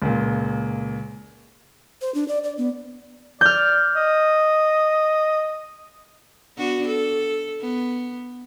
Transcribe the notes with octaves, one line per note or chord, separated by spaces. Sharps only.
C#2 A#2
C5
D4
D5
D5
B3
D5 F6 G6
D#5
B3 D4 F#4
A4
B3